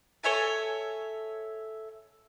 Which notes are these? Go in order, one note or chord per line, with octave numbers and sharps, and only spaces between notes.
A4 C#5 E5 G#5